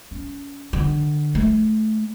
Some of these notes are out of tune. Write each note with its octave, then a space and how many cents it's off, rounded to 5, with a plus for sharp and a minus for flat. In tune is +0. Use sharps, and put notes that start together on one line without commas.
C#4 +25
D3 +20
A3 -20